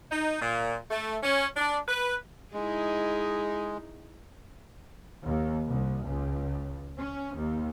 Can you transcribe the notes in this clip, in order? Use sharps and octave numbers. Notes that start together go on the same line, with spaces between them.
D#4
A#2
A3
C#4
D4
B4
G#3 D#4 E4 G#4
D#2
C2
C#2
C#4
D#2